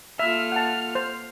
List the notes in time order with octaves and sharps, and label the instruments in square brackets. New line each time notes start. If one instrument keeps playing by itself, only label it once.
[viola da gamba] A#3 F4 A4 [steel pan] E5 [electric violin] F6
[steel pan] F#5 A5
C5